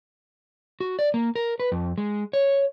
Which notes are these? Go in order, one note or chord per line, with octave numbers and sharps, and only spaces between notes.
F#4
D5
A#3
A#4
B4
F2
G#3
C#5